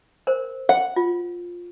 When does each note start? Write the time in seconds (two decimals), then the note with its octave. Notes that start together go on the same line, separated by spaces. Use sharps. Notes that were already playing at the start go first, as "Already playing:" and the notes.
0.27 A#4 C5
0.69 F#5
0.96 F4